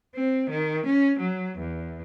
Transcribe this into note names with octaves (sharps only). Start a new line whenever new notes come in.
C4
D#3
C#4
F#3
E2